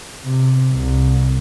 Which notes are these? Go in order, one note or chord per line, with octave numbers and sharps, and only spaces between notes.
C3
C2